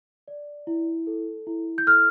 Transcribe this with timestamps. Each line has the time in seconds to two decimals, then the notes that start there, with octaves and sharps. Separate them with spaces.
0.28 D5
0.67 E4
1.07 A4
1.47 E4
1.78 G6
1.87 A4 F6